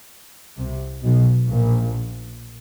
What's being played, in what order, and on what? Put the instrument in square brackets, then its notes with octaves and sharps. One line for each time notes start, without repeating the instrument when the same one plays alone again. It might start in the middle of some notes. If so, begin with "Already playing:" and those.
[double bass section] C2 C3
B1 B2
A#1 A#2